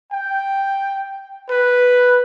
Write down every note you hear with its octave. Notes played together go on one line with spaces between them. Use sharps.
G5
B4